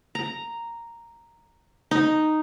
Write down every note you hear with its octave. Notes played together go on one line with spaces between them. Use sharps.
A#5
D#4